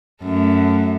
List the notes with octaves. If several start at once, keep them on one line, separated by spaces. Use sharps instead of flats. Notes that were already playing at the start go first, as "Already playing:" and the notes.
F#2 A3